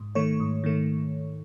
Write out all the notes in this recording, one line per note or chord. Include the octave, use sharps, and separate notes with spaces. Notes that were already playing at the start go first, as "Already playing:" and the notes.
Already playing: G#2
D#3 A3 C#5
G#2
D#3 A3